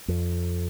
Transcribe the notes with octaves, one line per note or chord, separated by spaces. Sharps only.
F2